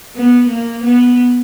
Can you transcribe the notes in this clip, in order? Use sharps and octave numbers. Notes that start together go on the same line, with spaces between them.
B3
A#3
B3